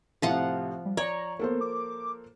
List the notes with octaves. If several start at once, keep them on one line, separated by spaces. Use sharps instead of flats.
A2 C3 F3 F4 F#5
G3
C#5 D5 A#5
A#3 B3 A4 C5
D6